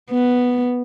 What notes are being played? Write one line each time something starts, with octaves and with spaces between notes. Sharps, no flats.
B3